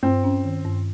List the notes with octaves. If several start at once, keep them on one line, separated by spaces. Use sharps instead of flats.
G2 C4
C#4
D#3
G2